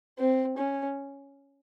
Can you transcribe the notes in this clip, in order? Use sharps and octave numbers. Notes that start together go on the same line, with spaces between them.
C4
C#4